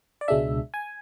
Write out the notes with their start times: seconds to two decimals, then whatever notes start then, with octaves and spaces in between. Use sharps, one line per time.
0.21 D5
0.28 C#2 B2 G#3 D4 E5
0.74 G#5